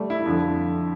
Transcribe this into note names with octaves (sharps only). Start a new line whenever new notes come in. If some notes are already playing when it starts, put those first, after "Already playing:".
Already playing: G3 A3
E4
F2 D3 F3